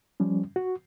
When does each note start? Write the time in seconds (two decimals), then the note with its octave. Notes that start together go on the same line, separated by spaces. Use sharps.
0.20 F3 G3 C#4
0.56 F#4